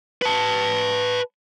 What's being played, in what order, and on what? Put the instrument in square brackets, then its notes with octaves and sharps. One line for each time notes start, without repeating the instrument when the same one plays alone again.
[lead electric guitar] B4 A5